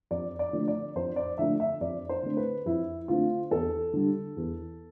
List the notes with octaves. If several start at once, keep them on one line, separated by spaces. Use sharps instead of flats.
F2 D5
D5
D3 F3 A3
D5
F2 C5
D5
D3 F3 A3 E5
E5
F2 D5
C5
D3 A3 C4
B4
F2 E4
D3 A3 C4 F4
E2 A4
D3 G3
E2